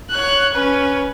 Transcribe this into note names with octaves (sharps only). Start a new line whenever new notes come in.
C#5 F#6
C#4 B4